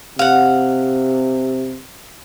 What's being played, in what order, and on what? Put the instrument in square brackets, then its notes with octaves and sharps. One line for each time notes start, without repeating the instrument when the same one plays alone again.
[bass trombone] C3 [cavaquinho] F5 F#5